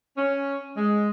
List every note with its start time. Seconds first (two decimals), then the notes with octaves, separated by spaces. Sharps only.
0.17 C#4
0.77 G#3